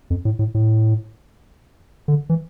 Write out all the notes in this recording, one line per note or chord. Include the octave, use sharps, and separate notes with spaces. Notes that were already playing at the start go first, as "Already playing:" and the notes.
F2
A2
A2
A2
D3
E3